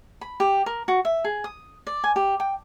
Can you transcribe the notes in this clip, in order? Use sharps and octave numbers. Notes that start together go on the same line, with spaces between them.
B5
G4
A#4
F#4
E5
G#4
D#6
D5
G#5
G4
G5